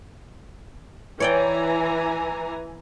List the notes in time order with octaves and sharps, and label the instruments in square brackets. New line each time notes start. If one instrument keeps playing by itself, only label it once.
[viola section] E3 G#5 A#5 [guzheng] C#5 D5 G5